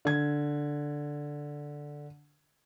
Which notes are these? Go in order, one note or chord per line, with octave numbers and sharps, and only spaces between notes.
D3 G#6